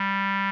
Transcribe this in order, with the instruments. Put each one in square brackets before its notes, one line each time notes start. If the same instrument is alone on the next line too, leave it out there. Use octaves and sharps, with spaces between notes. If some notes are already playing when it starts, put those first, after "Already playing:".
Already playing: [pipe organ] G3